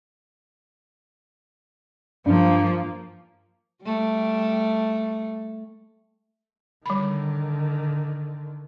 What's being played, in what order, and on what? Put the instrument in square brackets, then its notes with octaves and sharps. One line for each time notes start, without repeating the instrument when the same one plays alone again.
[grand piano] G2 [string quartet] F3 A#3
[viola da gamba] G3 A3
[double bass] D3 D#3 [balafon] G3 B5